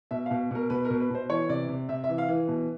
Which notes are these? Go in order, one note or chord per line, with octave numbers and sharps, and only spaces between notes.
B2 E5
B2 F5
B2 A#4
B2 B4
A#4
B2
B4
B2 C5
E3 C#5
C3 D5
C3
C3 E5
E5
E3
F5
E3
B2